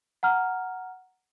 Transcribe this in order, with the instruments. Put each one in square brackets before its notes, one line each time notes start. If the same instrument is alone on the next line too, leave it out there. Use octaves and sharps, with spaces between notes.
[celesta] F#5 A#5 F6